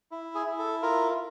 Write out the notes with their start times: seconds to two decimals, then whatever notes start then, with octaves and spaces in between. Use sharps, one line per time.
0.11 E4
0.35 G#4
0.46 E4
0.59 A4
0.82 F4 A#4